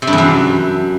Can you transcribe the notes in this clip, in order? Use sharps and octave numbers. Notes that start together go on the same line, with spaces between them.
C3
G2
E2
F#2